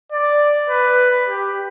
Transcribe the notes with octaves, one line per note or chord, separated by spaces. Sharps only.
D5
B4
G4